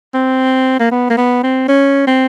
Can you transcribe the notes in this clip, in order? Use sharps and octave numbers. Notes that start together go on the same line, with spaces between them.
C4
A#3
B3
A#3
B3
C4
C#4
C4